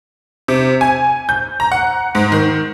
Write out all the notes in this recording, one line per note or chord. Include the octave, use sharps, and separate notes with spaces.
C3
G#5
G6
A#5
F#5
G#2
D#3